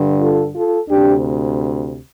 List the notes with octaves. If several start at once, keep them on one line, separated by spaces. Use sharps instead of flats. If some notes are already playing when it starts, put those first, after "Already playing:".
Already playing: G2 D3
F4 A4
F4 A4
D2 C3 D4 G4